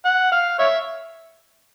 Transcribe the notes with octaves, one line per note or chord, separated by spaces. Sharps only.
F#5
F5
C#5 E5